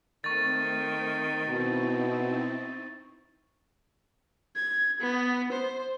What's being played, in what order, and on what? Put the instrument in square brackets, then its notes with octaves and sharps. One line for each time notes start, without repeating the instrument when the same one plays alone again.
[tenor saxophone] D#3 [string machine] A3 C4 [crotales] C#6 A6
[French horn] B2 [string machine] C4 D#4 E4
[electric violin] G#6
B3
C5